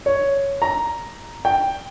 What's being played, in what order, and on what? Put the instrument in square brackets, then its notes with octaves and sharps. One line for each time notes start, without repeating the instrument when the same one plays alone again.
[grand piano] C#5
A#5
G5